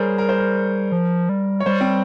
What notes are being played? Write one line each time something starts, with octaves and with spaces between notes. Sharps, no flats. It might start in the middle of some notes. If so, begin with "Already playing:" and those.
Already playing: G3 G#4 A#4 C5 C#5
A#4
C5
A#4
F3
G3
C#5
G3 C5
C4